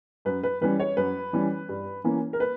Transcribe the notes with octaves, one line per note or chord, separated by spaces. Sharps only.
F#2 B4
B4
E3 G3 C#4 B4
C#5
F#2 B4
E3 G3 C#4
G2
E3 A#3 C#4
A#4
B4